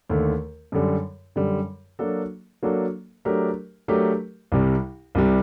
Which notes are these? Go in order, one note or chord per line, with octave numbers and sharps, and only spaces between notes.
D#2 D3 A3
F#2 D3 G3
F#2 D3 G3
F#3 A#3 D4 F#4 A4
F#3 A#3 D4 F#4 A4
F#3 A3 D4 G4 A#4
F#3 A3 D4 G4 A#4
C2 C3 G3
C2 C3 G3